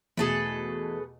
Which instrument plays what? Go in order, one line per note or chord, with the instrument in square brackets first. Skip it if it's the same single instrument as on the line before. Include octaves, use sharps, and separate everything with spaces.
[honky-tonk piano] E2 B2 A3 [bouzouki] G#4 A4 B4